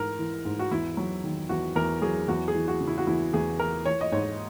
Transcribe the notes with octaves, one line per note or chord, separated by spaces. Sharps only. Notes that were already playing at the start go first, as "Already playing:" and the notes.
Already playing: G#2 E3 A#4
E3
G#2
F#4
E2 E4
F#3
D#3
E2 F#4
E2 A#4
F#3 G#4
E2 F#4
G#4
E3
F#4
C#3
E4
F#4
E2 E4
E2 G#4
E3 A#4
E3 C#5
D#5
G#2 C#5